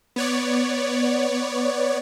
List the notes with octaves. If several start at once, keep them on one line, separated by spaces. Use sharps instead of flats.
B3 C#5 D5